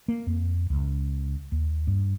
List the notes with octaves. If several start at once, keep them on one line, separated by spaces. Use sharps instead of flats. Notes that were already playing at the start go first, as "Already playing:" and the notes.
A#3
F2
C#2
D#2
G2